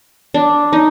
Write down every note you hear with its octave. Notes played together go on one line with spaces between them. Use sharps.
D4
D#4